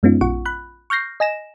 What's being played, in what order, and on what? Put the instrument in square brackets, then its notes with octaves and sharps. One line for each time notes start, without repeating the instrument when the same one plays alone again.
[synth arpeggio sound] F#2 G#3 B3 C#4 D#4 F4
A#1 F4 F#5 C#6
B5 F#6
C#6 F6 G6 A#6 C7
D#5 G#5 A#6 E7